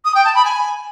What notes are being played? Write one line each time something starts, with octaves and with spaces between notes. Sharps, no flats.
D#6
G5
A5
B5
G#5